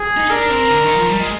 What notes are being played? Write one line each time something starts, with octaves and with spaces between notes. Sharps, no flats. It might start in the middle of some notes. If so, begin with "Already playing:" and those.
Already playing: G#4
D#4
D4 A#4
C4
D3
D#3
F3
G3
G#3